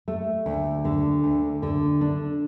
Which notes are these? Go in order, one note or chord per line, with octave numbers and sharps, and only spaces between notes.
A3
D2
D3
D2
D3
D4